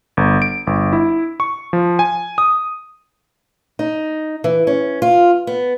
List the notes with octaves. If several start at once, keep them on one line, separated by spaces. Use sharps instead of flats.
G1
D7
G1
E4
C#6
F3
G#5
D#6
D#4
E3
C#4
F4
B3